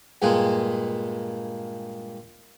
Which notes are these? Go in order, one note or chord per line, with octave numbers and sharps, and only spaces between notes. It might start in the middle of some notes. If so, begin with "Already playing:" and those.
G2 A#2 G#3 A#3